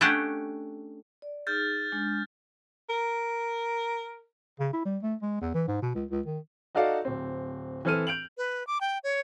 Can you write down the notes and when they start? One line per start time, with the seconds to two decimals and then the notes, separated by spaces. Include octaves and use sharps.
0.01 A3 C#4 D4 G4 F#5
1.22 D5
1.47 D#4 G#4 F6 G6 A6
1.92 G#3 D4
2.90 A#4
4.59 C#3
4.73 E4
4.85 G3
5.03 A3
5.22 G#3
5.41 E2
5.54 E3
5.67 G#2
5.82 B2
5.95 C#2
6.11 C#2
6.26 D#3
6.75 D#4 F#4 A4 D5 F5
7.05 D1 C4
7.85 E3 C4 A4 F6 D#7
8.07 G6 D7 F7 F#7
8.38 B4
8.67 D6
8.81 G5
9.04 C#5